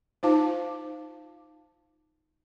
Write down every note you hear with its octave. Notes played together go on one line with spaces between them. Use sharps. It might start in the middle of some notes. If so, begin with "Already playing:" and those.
D#4 F4 C5 F5 A5 D6